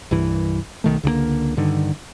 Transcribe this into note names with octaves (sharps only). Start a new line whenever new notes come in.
C2 G2 E3
B1 D#3 A3
C#2 D3 F3 A#3
G2 D3 D#3